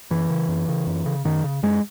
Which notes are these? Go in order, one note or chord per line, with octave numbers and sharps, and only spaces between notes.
F#2 E3
C#3
F#2
C#3
F#2
C#3
F#2 D#3
C#3
F#2 G#3